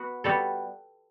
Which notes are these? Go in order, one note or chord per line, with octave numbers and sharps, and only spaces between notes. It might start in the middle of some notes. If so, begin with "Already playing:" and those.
Already playing: B3 F#4
G3 B3 F#4 A4